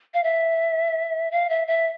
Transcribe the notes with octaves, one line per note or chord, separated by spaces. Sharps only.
F5
E5
F5
E5
E5